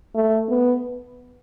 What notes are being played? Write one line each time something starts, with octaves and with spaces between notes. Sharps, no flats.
A3
B3